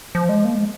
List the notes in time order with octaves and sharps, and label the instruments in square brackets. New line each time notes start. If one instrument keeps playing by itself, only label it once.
[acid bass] F3
G#3
A#3
G#3